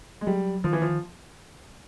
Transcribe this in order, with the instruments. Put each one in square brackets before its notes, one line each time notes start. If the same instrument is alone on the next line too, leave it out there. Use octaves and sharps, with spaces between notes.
[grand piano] G#3
[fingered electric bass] F#3 [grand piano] G3
[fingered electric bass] D#3 [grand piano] F3
[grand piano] E3
F3